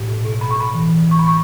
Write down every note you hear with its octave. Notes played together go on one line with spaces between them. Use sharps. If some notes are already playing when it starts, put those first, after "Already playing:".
Already playing: A2
B2
B2
B2 B5
C#6
B2 B5
E3
E3
E3
C#6
A2 B5
C#6